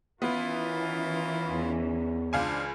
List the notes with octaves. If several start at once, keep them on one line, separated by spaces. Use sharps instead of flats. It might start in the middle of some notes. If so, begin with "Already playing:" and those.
D#3 E3 B3 C#4 E4 F4
E2
C#2 D4 C5 F5 G#5